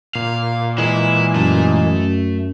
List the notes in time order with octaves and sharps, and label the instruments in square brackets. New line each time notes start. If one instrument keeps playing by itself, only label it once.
[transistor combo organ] A#2 [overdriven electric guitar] F5
[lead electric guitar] E3 G#3 [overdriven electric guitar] E4
[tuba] F#2 [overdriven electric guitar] A3 A5